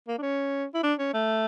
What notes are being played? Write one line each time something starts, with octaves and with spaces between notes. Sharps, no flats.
A#3
D4
C#4
E4
D4
C#4
A3